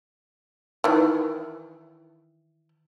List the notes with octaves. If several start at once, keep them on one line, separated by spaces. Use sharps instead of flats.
D#3 E3